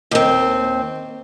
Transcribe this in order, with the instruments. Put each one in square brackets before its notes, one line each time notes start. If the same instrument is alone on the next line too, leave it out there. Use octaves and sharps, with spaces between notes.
[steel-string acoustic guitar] D#2 C4